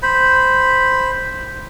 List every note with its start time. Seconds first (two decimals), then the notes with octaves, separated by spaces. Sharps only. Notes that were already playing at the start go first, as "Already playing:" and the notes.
0.03 C5 B5